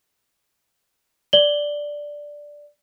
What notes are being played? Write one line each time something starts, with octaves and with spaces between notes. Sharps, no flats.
D5 F#7 G7